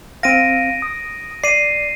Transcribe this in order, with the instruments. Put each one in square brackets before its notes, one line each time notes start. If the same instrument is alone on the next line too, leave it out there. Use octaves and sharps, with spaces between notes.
[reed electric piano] C4 F5 [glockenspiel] A#6 D7 D#7
[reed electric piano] D#6
[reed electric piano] D5 [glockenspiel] C7 D#7